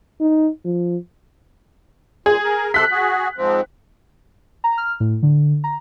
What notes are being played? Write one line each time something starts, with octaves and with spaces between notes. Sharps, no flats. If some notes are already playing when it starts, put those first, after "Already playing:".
D#4
F3
A#2 G#4
A#4
C3 A4 C6 F#6 B6
F#4 G#4
G#2 F3 C4
A#5
F6
A2
D3
A#5